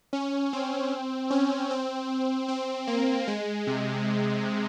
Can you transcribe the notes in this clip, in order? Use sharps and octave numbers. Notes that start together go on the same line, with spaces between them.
C#4
C4
C#4
C4
C4
A#3
G#3
C3